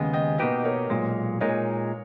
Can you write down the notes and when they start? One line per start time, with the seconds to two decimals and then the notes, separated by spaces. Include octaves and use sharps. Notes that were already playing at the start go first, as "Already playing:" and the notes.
Already playing: D#2 C#3 G#3 B3 D#5 G5
0.13 D#5 G5
0.38 B2 A#3 D#4 G4 B4 D#5
0.64 A#4 C#5
0.90 B1 A#2 G#3
1.41 A#2 G#3 D#4 A#4 C#5